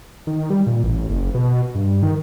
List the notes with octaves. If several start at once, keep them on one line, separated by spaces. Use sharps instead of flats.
D#3
G3
A#2
A1
F#1
B2
G2
D#3